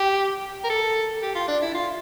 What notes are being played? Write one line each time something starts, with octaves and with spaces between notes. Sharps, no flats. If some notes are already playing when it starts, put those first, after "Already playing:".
Already playing: G4
A#4
A4
G4
F4
D4
E4
F4